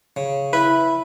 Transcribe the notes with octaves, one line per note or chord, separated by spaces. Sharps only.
C#3
E4 B4